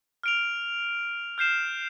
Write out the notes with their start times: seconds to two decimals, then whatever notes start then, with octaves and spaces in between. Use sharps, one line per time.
0.23 F6 D7 F7
1.38 F6 G6 C7 E7